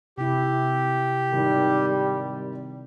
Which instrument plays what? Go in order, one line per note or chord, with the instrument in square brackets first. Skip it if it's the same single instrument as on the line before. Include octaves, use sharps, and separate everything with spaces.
[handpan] C3 E4 [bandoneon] G4
[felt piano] G#1 D#3 [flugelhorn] G3